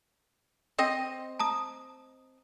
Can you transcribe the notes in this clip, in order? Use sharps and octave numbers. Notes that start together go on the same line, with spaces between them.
C4 D#5 G5
A5 A#5 D#6